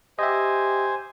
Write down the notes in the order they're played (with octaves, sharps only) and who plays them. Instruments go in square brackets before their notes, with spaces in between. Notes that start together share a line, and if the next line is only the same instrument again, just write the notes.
[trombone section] G4 [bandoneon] C5 G#5 [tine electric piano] D#5 E5